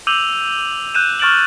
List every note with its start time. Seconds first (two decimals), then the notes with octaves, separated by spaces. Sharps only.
0.07 D6 E6 G6 D#7 F7 F#7
0.94 F#6 G6 D#7 E7
1.19 C#6 F6 A6 D7 E7 F#7